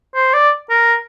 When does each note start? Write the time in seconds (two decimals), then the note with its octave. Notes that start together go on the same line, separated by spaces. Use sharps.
0.15 C5
0.34 D5
0.70 A#4